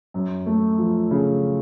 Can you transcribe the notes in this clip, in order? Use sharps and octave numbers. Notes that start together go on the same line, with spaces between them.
F#2
A3
F3
C#3